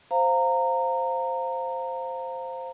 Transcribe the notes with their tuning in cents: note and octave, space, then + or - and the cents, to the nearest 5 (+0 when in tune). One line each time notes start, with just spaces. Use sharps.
C5 +0 F5 +0 A#5 -20